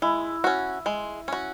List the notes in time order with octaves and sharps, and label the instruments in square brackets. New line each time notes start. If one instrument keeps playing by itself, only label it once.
[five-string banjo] G#3 [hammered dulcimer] E4
[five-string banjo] C#4 F#4
G#3
C#4 F#4